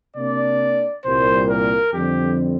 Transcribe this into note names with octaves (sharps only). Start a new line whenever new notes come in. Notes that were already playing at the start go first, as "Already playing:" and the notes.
C3 A#3 D4 D5
C2 A#2 G3 A#3 C5
A#4
F2 D3 G3 C4 G4